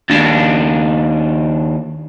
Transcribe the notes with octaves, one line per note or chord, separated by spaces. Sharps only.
D#2 D4